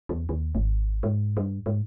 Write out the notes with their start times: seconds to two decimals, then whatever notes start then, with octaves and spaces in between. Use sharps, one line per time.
0.09 E2
0.29 D#2
0.55 G#1
1.03 G#2
1.37 G2
1.66 G#2